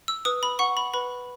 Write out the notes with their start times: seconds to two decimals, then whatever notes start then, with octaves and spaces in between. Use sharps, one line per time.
0.08 E6
0.25 B4 D#6
0.43 B5
0.59 F#5 C#6
0.77 B5
0.94 B4 B5